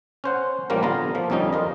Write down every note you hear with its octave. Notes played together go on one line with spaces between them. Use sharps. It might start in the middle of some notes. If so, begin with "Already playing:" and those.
C#4 C5 F#5
A1 F3 G3 A#3 C#4 A#4
D3 B3 F4 F5 A#5
F3 A#3
F2 D3 G3 C#4 D#4
F4 A#4 D#5